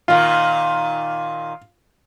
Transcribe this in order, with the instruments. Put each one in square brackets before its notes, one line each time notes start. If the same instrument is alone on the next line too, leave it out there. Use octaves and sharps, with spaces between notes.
[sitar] A#2 D#3 [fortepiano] F4